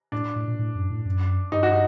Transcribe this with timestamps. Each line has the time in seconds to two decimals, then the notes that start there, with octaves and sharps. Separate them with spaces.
0.12 A2 D4
0.36 A2
0.48 A#2
0.59 A2
0.75 F#2
0.90 A2
1.05 F#2
1.52 G2 D#4
1.63 F#4
1.72 D#4